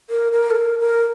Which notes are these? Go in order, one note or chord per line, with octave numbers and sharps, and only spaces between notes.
A#4
A#4
A4
A#4
A#4